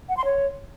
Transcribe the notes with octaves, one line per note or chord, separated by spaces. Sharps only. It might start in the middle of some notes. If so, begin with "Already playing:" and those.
F#5
C6
C#5